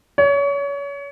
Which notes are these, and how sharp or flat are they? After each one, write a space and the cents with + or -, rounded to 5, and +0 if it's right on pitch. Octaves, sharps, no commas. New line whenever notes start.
C#5 +30